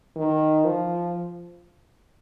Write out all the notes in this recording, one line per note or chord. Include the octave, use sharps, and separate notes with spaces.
D#3
F3